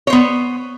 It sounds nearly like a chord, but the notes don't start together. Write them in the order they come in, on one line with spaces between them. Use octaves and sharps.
C#5 C5 B3